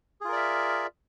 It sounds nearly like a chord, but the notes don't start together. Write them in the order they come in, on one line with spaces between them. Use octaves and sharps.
G#4 F4 A#4 D5 E5